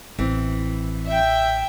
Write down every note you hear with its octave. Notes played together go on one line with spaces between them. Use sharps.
A1 E3 C4
E5 G5